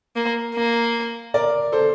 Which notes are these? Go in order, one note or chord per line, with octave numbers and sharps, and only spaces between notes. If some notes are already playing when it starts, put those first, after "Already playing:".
A#3
A#3
A#4 D5
A4 C5